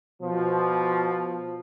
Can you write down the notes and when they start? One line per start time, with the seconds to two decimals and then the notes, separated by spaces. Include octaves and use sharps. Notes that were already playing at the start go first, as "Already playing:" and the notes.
0.22 B2 F3